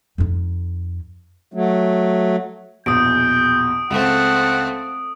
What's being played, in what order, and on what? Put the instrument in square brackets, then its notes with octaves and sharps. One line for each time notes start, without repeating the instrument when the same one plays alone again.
[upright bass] F2 D#4
[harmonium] F#3 A3
[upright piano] A#1 E2 B2 [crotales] D#6 D7 [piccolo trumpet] G6
[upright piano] C#2 [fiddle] A3 C4 [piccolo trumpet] F#5